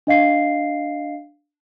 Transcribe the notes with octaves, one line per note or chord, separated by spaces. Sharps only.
D4 D#5 F5 C7